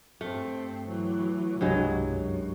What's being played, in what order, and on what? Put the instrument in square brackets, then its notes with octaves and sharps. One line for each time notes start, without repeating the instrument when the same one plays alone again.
[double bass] G2 C4 [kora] A3
[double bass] E3 F#3
[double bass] C2 B2 [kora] G2 F#3 G#3
[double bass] F#2